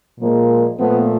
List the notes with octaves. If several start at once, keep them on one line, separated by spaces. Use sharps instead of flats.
A#2 F3 G#3 A#3
A#2 F3 A3 B3